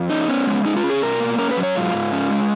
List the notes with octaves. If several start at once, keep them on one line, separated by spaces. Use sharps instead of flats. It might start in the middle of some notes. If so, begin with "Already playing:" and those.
Already playing: F2
C#4 D#4
B3 C#4
G#3
C#4 D#4
F4
C#4
G#4
B2 A#4
A#3
C#4 A#4
B4
F#3
C#5
G#2 F4
G#2
C#4
G#3